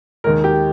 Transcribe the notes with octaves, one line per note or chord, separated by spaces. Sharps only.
D#2 D#3 G#3 A#4
G4